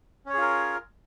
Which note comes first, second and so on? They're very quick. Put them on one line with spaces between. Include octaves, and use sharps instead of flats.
C#4 C#5 G#4 F4 A#4